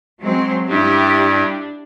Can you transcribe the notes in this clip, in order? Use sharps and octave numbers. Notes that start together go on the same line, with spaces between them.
F#3 G#3 C4
G2 D4 E4 G4